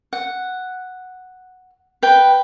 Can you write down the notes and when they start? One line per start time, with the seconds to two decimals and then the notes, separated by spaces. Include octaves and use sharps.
0.13 F#5
2.03 B4 G5